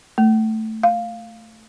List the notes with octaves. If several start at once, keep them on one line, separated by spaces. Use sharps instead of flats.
A3
F5